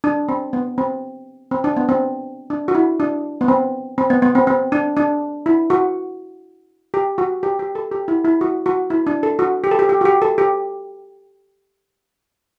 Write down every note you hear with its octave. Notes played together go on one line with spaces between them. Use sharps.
D4
C4
B3
C4
C4
D4
B3
C4
D4
F#4
E4
D4
B3
C4
C4
B3
B3
C4
C4
D4
D4
E4
F#4
G4
F#4
G4
G4
A4
G4
E4
E4
F#4
F#4
E4
D4
A4
F#4
G4
A4
G4
G4
F#4
G4
A4
G4